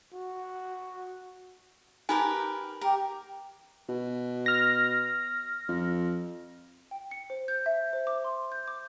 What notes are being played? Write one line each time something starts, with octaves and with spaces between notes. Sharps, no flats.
F#4
D#4 G4 A#4 B4 G#5
G4 A#4
B2
F6 A#6
F2
G5
C#7
C5
G6
E5
C5
D6
C6
G6
D6